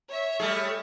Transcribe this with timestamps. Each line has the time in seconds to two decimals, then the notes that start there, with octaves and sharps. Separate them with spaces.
0.10 C#5 E5
0.40 G3 A3 G#4